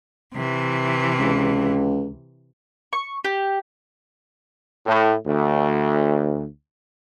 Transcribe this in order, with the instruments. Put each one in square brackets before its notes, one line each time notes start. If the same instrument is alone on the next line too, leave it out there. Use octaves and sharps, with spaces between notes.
[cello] C3 E3
[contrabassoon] C#2
[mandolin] C#6
G4
[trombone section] A2
D2